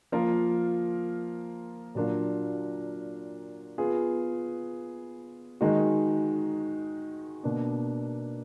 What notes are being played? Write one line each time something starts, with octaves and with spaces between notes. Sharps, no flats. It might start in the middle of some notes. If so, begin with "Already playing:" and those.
F3 A#3 F4 A#4
A#2 F#3 D4 F4 A#4
B3 F4 G#4
D#3 G#3 D#4 F#4
B2 A#3 D4